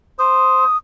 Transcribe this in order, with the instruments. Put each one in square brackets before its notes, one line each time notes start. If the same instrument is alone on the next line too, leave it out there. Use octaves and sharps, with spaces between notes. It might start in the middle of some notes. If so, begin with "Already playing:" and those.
[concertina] C5 [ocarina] D#6